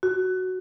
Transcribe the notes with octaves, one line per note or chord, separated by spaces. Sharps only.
F#4